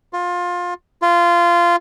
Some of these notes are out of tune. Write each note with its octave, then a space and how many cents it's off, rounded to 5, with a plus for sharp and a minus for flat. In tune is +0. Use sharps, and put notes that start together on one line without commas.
F4 +20
F4 -15